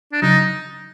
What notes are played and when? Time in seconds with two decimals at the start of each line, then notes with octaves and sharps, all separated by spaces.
0.12 D4
0.22 C#3 F#3 D#4